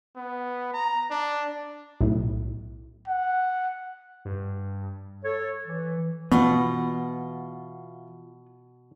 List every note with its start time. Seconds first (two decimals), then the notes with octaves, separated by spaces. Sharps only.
0.16 B3
0.74 A#5
1.11 D4
2.01 B1 A2
3.08 F#5
4.25 G2
5.24 A4 C#5
5.66 E3
6.32 B2 E3 B3 F4 F#5